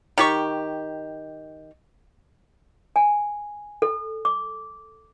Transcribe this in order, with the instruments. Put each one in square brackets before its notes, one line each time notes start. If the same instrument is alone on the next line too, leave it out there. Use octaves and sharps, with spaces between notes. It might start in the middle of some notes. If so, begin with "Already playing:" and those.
[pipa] D#3 G4 C#6
[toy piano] G#5
A4
D6